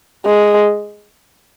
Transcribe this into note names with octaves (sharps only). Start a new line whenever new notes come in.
G#3